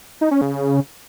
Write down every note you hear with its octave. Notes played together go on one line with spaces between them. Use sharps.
D#4
C#4
C#3